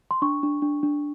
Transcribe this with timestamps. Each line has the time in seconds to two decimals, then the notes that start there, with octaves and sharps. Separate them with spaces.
0.11 C6
0.22 D4 C#6
0.43 D4
0.62 D4
0.83 D4